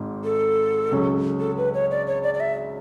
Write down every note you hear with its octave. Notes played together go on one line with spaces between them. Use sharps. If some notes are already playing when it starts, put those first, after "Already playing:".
Already playing: G#1 G#2
A4
C#2 C#3 F#3 C#4
A4
B4
C#5
D5
C#5
D5
D5
E5